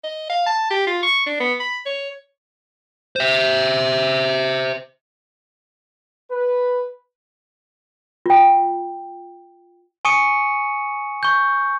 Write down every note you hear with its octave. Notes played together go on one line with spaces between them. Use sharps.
D#5
F5
A5
G4
F4
C#6
D4
B3
B5
C#5
C5 E5
B4
F4 G5
G#5 C#6 D#6 C#7 D#7
C#6 G6